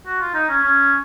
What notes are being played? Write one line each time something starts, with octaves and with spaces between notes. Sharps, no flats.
F#4
F4
D#4
C#4
C#4